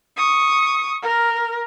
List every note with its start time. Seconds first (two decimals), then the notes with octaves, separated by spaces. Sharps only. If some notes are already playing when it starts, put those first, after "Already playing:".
0.17 C#6 D#6
1.03 A#4